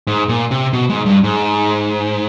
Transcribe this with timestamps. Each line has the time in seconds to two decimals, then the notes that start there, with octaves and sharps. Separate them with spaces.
0.07 G#2
0.29 A#2
0.51 C3
0.73 B2
0.90 G#2
1.06 G2
1.24 G#2